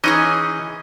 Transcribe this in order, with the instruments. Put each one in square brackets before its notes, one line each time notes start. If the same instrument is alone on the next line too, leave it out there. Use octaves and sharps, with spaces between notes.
[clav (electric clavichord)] E3 C#4 D#5 [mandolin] D#4 F4 G#4